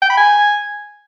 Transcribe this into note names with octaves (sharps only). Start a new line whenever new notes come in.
G5
B5
G#5